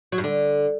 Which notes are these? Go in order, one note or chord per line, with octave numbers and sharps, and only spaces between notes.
F#3
G2
D3